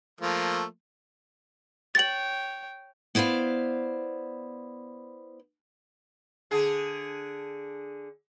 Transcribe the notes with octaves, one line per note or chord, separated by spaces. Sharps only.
F3 A3 A#3
C#5 G5 A6 F#7
B3 E4 C5 D5 F5
D3 D4 G#4